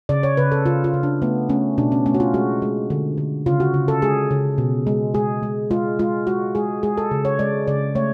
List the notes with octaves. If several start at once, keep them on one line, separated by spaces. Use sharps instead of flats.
C#3 D5
C#5
C#3 B4
A4
C#3 F4
F4
C#3
D4
A3 B3
A3 C#4
B2 D4
C#4
A3 C#4
F#4
F4
G#3 F#4
G#3
D3
D3
C#3 F4
F#4
C#3
A4
G#3 G#4
C#3
B2
G#3
G#3 G#4
G#3
G#3 F4
G#3 F4
G#3 F#4
G#3 G#4
G#3 G#4
A4
C#3
C#5
G#3 D5
C#3 D5
A3 C#5